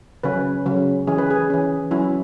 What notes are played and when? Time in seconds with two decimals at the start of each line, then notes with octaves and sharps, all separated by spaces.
0.23 C#3 F#3 C#4 B4
0.66 C#3 F#3 C#4
1.07 E3 C#4 G#4
1.18 B4
1.30 G#4
1.50 E3 C#4
1.91 F#3 C#4 E4